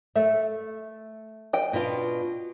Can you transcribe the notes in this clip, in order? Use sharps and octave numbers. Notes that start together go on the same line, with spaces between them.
A3 E5
D#5 G5
B2 D4 F4